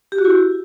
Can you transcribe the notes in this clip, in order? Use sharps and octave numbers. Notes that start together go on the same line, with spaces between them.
G4
F#4
E4